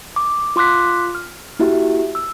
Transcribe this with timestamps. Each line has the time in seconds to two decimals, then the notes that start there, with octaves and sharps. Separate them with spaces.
0.16 D6
0.56 F4 C6 D6 F#6 B6
1.15 F6
1.59 A#3 E4 F#4 G4 E5
2.15 E6